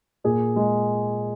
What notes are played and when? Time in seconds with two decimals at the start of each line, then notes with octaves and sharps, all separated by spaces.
0.24 A#2 G#4
0.56 G#3